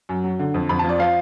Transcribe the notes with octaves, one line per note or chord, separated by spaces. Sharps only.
F#2
F#3
D3
F2
F2 B5
A5
F3
D5
F3 F5